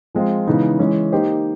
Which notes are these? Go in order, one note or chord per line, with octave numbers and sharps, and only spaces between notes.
F3 G#3 C4 F4
C#3 E3 G#3 B3 D#4
E3 G#3 C#4
A#3 D#4 G4 C5 D#5